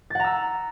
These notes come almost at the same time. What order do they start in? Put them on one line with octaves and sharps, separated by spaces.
A6 F#5 A#5 E6